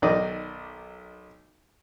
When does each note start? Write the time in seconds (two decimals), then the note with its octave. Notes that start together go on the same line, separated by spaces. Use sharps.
0.02 B1 D#3 D5 D#5